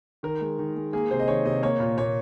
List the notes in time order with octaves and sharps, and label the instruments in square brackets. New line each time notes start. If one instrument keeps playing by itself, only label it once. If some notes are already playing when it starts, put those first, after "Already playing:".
[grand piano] D#3 A#4
G#3
D#3
G#3
A#3 G#4
C3 C5
D#5
D#3 C#5
C3 D#5
A#3 C#5
A#2
A#2 C#5